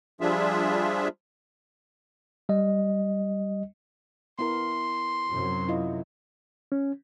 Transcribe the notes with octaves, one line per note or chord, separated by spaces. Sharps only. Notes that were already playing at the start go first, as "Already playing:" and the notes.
F3 G3 D4 F4 G#4 E5
G3 D#5
B3 E4 A#4 C6
F#2 C3 F#3
E4 F4 D#5
C#4